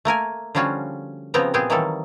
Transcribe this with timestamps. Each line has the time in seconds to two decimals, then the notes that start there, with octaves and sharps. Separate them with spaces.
0.05 A3 A#3 A#4 G#5
0.55 D3 F3 G3 C#4 F4 F#4
1.34 C#3 F3 B3 C4 G4 A#5
1.54 A#2 B3 C4 G4 G#4
1.70 D#3 E3 F#3 G3 A#3 A4